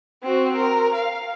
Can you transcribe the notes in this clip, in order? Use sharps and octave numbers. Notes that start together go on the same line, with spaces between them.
C4 F#4
A#4
F5